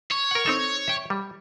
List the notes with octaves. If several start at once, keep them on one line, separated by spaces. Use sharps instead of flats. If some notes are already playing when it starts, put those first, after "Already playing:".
C#5
A#4 F#5
C4 D#4 A4
E5 G5
G3